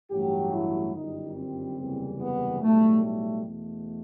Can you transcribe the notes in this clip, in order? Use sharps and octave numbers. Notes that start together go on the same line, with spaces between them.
A1 G2 F#3 A3 G4
E4
G1 F#2 D#3 G3 D#4
C4
F#1 E2 C3 E3 G3
B3
B1 A2 G3 A3
A3
E2 B2 A3